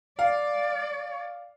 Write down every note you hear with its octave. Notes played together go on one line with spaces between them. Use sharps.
D5 F5